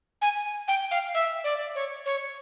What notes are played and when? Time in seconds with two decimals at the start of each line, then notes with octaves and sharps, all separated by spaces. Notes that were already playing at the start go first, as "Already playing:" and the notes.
0.22 G#5
0.68 G5
0.91 F5
1.14 E5
1.44 D5
1.75 C#5
2.06 C#5